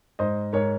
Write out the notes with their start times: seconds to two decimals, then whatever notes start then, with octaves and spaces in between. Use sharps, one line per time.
0.19 G#2 C5 D#5
0.53 G#2 A#4 C#5